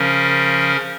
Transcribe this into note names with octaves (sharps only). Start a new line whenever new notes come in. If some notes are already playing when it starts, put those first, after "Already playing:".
Already playing: C#3 F3 C#4 A#4